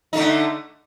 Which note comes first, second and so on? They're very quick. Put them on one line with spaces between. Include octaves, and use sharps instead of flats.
D#4 A3 D3